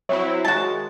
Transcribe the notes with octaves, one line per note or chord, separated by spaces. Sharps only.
F#3 C4 E4 C#5 E5
D#3 G#3 F#4 A5